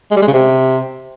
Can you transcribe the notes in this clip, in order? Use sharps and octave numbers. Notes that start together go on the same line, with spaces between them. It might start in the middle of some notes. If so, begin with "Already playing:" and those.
G#3
G3
G#3
C#3
C3